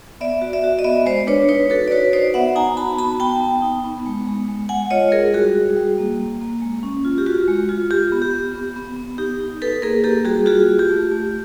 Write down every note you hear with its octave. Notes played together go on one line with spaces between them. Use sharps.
B3 D5 E5
F#4
D5 E5
F#4
D#5
B3 D5 E5
G#3 C5 D5
D4 B4 C#5
D#4 B4 C#5
F#4 A4 B4
D5
F#4 B4 C#5
D#4 C5 D5
B3 E5 F#5
D#4 G#5 A#5
F#4 A5 B5
B3 A5 B5
B3 G5 A5
B3
D#4
B3
G#3
G#3
G#3
G#3 F#5 G#5
F4 C#5 D#5
G#3 G#4 A#4
G3 F#4 G#4
F#4
G3
A#3
A#3
A#3
G#3
C#4
F4
G4
F4 F#4
G#3
F4
F4 G4
B3
G4
B3
B3
B3
B3
D#4 G4
D#4
D#4 A4 B4
A#3 G#4 A#4
A#3 G4 A4
G3 F#4 G#4
F4 F#4 G#4
F4
G4
A3
A3